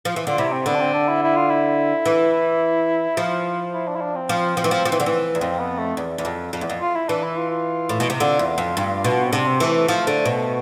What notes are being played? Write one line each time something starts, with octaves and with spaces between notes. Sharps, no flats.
F3
E3
D3 F4
C3 E4
C4
D3 B3
D4
C4
D4
E4
E4
F4
E4
E3
F3
E4
D4
E4
D4
C4
F3
F3
E3
F3
F3
E3
D3
E3
E2
F2 C4
B3
A3
E2
E2
F2
F2
E2
F2
F4
E4
E3 D4
E4
F4
F4
A2
B2
C3
D3 F4
E2
F2
G2
B2
C4
C3 D4
C4
E3 A3
A3
F3
D3
B2